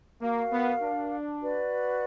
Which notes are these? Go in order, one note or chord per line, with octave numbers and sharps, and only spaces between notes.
A#3 F#4 A#4 F5
B3
D4
F#4 B4 D5